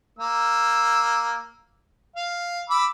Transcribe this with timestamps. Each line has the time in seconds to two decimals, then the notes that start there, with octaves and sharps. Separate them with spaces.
0.19 A#3 E6
2.16 F5
2.70 B5 D6 E6